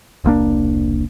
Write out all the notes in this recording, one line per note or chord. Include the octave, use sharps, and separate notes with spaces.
E1 C2 A#3 D4